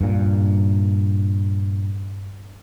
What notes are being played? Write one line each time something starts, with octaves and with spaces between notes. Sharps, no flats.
G2 A#2